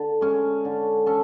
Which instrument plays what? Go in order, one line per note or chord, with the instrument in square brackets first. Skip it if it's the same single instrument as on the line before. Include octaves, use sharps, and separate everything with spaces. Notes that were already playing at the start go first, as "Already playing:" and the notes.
Already playing: [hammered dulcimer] D3
G#3 C#4
D3
C#4 A4